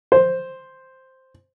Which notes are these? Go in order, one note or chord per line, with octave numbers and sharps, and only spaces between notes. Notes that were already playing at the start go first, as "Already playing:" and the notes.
C5